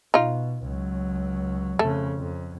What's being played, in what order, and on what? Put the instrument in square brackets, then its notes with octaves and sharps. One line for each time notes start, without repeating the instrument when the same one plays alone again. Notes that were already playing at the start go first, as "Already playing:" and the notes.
[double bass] B2 [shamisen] D#4 F4
[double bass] C#2 F#3
[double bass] F2 C#3 [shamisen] A3
[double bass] F2